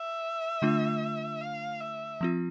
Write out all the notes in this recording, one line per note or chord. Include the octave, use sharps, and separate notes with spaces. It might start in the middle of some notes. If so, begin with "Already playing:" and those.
Already playing: E5
D3 A3 D4 F4
F5
E5
F3 C4 F4